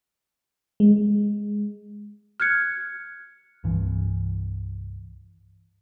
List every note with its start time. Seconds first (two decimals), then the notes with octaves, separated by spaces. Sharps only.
0.80 G#3
2.40 F6 F#6 G#6 C#7
3.64 C2 G2 E3